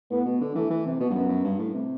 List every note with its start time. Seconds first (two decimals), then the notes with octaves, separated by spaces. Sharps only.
0.11 A2 B3
0.26 B2
0.41 D3
0.55 E3 A3
0.71 E3
0.86 C3
1.00 B2 B3
1.10 G2
1.15 F#2
1.29 F#2
1.44 G2
1.59 A2
1.74 C3